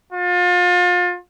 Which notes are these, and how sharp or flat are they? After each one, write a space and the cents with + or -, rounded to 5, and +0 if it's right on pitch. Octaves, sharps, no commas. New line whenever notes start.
F4 +35